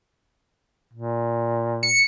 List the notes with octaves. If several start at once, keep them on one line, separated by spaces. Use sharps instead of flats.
A#2
C#7